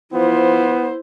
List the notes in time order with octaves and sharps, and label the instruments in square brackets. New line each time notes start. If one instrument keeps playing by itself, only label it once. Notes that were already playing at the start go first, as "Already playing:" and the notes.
[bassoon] F3 [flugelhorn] B3 [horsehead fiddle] E4 C5